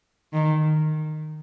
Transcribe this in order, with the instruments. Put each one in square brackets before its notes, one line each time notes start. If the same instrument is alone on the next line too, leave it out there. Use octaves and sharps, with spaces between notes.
[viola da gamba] D#3